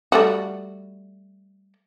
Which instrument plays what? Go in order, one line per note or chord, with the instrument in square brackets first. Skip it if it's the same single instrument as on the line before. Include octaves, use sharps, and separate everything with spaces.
[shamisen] G3 A3 F#4